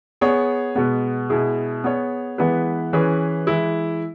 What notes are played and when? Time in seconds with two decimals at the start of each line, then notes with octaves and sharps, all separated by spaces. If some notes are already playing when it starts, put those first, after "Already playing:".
0.21 B3 G#4 C#5
0.75 B2 G#3 B3
1.30 B2 G#3 E4 G#4
1.84 B3 G#4 C#5
2.38 E3 G#3 B3 E4 B4
2.93 E3 C#4 G#4 B4
3.47 E3 G#3 E4